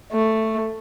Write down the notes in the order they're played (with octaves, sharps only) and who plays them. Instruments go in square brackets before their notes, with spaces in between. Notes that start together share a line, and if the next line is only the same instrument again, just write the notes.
[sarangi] A3